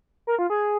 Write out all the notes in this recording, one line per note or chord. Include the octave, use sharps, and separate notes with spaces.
A#4
F4
G#4